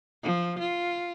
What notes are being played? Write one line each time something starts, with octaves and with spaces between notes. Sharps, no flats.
F3
F4